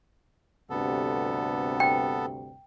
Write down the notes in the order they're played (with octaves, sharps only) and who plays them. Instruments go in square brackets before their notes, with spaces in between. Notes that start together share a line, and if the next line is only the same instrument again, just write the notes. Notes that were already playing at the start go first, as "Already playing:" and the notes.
[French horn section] D2 G2 C3 [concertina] B3 A4
[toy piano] G5